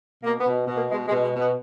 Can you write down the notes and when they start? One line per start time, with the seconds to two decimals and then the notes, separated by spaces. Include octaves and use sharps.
0.24 B2 A#3
0.41 B3
0.47 B2
0.68 B2
0.73 A#3
0.89 B2 G#3
1.07 G#3
1.12 B2
1.23 G#3
1.34 B2
1.39 B3